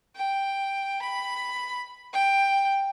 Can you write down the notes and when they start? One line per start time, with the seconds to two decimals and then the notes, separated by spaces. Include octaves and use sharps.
0.16 G5
1.02 B5
2.13 G5